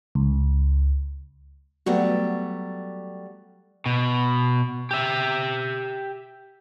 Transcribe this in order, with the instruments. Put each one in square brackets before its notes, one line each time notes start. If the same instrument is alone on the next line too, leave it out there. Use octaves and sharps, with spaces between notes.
[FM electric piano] C#2
[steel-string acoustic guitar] F#3 G3 A3 [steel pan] B3 F#4
[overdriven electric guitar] B2
G4 E5